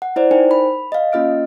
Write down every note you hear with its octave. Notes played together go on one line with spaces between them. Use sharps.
F#5
E4 C5 D5
D#4 A#4 C5 G5 G#5
B5
D#5 F5
A#3 C#4 F4 D#5 F6 D7